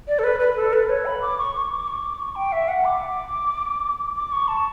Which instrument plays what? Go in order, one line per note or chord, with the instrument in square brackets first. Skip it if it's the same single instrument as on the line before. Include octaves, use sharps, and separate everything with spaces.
[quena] D5
A4
B4
B4
A4
B4
C#5
B5
D6
C#6
C#6
D6
C#6
D6
C#6
G5
E5
F#5
D6
D6
C#6
A5